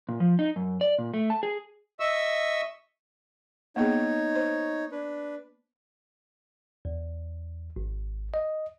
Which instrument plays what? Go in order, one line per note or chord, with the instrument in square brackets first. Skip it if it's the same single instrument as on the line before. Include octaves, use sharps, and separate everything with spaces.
[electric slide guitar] A#2
F3
D#4
F#2
D5
A#2
A3
A5
G#4
[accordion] D#5 E5 C#6 E6
[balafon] A#3 B3 G#4 [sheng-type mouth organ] D#4 C#5
[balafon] C5
[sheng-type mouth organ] D4 B4
[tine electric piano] E2
G#1
D#5